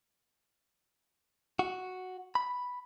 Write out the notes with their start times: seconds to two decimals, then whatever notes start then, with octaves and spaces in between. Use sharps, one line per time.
1.59 F#4
2.35 B5